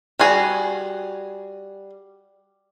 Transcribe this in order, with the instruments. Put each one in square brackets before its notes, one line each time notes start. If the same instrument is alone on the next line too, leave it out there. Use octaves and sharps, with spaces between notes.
[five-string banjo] G3 F#4 G#4